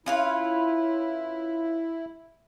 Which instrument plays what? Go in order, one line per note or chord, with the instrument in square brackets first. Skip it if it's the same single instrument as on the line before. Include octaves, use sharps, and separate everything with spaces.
[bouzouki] C#4 F4 B4 [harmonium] E4